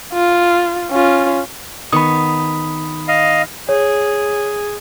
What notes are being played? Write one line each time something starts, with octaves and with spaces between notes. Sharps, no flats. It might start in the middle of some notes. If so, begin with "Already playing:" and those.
F4
C#4 F4
D#3 B3 B5 C#6 D#6
D#5 F5
G#4 C#5